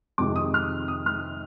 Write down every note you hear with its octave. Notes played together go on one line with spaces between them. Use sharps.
F2 C3 D#3 G#3 D#4 D6
D#6
F6
D#6
F6